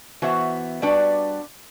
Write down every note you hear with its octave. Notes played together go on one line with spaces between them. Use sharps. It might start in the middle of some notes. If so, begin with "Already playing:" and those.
E3 B3 F#4 C5 E5
G3 D4 F#4 B4 D5